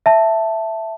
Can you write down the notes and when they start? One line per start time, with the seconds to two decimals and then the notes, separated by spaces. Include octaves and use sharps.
0.06 E5 A5